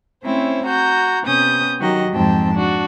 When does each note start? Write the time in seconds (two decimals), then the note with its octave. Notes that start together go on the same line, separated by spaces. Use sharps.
0.24 A3 C4 C#4 E4 C5
0.65 F#4 A#5 G6
1.24 C3 B3 C#4 D#6 G6
1.79 D#3 F#3 F#4 G4 D#5
2.11 F2 G#2 C4 G5 A5
2.54 D4 F#4